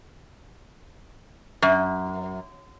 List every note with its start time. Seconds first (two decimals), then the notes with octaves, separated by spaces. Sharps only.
1.62 F#2